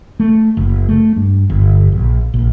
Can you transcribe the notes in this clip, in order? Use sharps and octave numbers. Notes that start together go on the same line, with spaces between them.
A3
F#1
A3
G2
G1
A#1
A#1